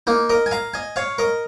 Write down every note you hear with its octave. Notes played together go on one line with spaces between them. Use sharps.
A#3 D#4
A#4 D#5
G#5
F5 A#5
D#5 G#5
C#5 F5
A#4 D#5